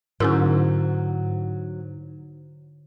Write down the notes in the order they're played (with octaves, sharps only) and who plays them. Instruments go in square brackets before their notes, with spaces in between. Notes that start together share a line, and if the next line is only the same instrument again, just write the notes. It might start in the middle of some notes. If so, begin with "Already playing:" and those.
[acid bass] G#2 [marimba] D3 E4 C6 [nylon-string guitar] F#3 [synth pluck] C#4 G#4 A#4